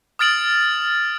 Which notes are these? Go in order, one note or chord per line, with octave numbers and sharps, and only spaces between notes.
D#6 F6 A6 D7 F#7